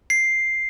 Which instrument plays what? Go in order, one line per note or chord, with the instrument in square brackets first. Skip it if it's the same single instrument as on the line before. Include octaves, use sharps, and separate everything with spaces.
[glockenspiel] C7